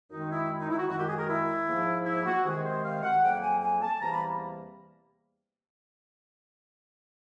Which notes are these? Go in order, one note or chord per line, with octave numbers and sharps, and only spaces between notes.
F#2 D#3 G#3 D#4
E4
D#4
E4
F#4
F#2 D#3 G#3 F#4
G4
G#4
A#4
E4
G#2 F3 A#3
E4
F#4
C3 D#3 G#3 G#4
C5
F5
F#5
F2 C#3 F#3 A#3 G5
G#5
G#5
A5
E2 C3 E3 G3 A#3 A#5
B5